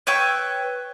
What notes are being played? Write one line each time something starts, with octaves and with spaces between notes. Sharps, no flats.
B4 C#5 G5 E6